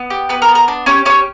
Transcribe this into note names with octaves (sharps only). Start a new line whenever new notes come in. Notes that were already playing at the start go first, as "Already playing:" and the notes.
Already playing: B3
G4
B3 B4
A#4
B3
A#4
D4
C#4 G4 C#5
C#4 G4 C#5